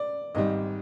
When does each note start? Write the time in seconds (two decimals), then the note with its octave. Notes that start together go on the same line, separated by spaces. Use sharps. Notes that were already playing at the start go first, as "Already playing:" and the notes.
Already playing: D5
0.35 G#1 G#2 G3 D#5